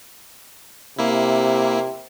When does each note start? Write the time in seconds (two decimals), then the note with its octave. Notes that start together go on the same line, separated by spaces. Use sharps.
0.99 C3 A#3 E4